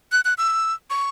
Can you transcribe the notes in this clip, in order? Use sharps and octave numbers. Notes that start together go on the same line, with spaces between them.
F#6
F#6
E6
C#6